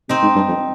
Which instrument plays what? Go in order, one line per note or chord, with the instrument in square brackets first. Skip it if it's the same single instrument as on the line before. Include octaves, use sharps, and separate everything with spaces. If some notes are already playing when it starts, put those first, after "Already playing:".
[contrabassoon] C3 [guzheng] C4 D#4
[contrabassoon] G#2
G2
F2